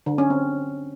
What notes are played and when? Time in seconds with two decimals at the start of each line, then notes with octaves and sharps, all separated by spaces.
0.06 D3
0.18 C#4
0.30 C4